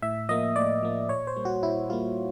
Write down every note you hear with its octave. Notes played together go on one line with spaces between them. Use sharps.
A2 E5
F3 A#3 D#5
A2 D5
F3 A#3
A#2 C#5
C5
G3 A#3
F#4
A#2 E4
G3 A#3 F4